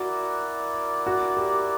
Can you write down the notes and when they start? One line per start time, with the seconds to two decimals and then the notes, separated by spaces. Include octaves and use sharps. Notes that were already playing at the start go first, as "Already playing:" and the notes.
Already playing: E4 F#4 A#4 D5
1.06 F#4
1.37 G4